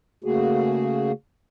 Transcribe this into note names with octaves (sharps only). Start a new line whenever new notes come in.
C#3 A3 A#3 F#4 G#4